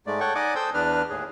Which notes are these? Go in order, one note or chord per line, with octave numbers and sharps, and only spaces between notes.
G#2 G#3 A3 D5
A4 C#5 F#5 G5 C#6
D#4 D5 D#5 F#5 G#5 D6
A4 C5 G5 D#6 E6 G6
E2 D4 B4 F6
D#2 A2 G#4